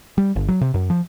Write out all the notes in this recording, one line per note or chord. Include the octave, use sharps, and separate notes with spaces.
G3
G1
F#3
C3
F#2
F3